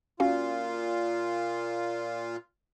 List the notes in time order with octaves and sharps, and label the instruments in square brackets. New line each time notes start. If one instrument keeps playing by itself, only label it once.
[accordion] A#2 F4 [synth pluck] C#4 F#4 F5